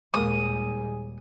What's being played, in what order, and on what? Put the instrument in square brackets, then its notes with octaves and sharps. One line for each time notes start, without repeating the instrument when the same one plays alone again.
[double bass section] D#2 A#2 G3 [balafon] G#3 A#3 A#4 [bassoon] G#4 [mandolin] D#6